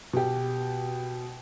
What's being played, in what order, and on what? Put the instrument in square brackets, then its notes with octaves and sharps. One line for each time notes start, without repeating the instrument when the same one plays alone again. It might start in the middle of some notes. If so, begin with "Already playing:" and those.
[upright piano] B2 G4